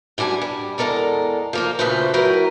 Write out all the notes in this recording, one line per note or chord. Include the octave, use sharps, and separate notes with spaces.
F#2 G3 D4 A4 G#5
G3
E2 G#3 A4 A#4 D5
F3 A#3 F4
D2 A#2 C#3 A3 B4 C5
F#3 E4 A#4 B4 G5